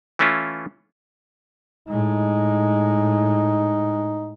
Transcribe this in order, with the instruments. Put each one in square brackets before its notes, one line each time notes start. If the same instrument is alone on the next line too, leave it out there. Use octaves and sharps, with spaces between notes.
[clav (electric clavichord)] E3 A3 C#4 E4 F4
[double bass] A2 G#3 [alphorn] D#4